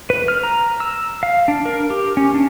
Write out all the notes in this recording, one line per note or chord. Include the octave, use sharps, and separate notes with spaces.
B4
F6
A#5
E6
F5
D4
A#4
G4
C#4
D4